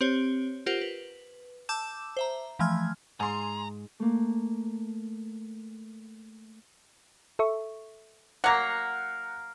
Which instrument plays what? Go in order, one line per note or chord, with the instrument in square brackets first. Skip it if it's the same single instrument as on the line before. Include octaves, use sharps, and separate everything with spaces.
[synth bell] C4 G4 C5 C#5
F4 G4 A#4 C5 F#5
B4
A5 D6 E6 G6 E7
C5 E5 A#5
E3 F3 A3 G#5 F6 G#6
[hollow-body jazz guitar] G#2 [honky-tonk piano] G#5 C6 [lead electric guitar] A#5
[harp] A3 A#3
[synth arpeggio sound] A4 E5 C#6
[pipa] F#3 A#3 [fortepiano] F#5 A#5